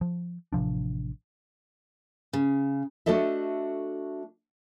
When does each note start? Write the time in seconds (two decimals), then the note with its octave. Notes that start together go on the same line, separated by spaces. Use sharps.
0.01 F3
0.53 A1 C3 F3 D4
2.33 C#3
3.06 A3 D4 F#4 A4 D#5 E5